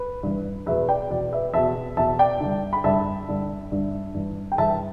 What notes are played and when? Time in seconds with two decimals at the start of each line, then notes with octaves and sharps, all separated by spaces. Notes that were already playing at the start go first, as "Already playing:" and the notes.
Already playing: B4
0.23 G2 E3
0.66 E2 B2 B4 E5
0.89 D5 G5
1.10 E2 B2 D5
1.32 B4 E5
1.53 E2 B2 E5 A5
1.97 E2 B2 E5 A5
2.19 D5 G5
2.40 G2 D3
2.73 B5
2.84 G2 D3 E5 A5
3.29 G2 D3
3.72 G2 D3
4.14 G2 E3
4.52 G5
4.58 G2 E3 E5 A5